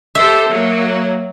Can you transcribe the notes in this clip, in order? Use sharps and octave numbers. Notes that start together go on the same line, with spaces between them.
G4 A4 C5 E5
F#3 A#3